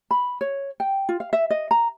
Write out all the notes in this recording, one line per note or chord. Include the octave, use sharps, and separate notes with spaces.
B5
C#5
G5
F4
F5
E5
D#5
A#5